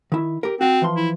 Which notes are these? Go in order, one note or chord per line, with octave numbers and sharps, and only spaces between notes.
D#3 E4
G4 A#4
C4 F#4
E3 F3 C6
E4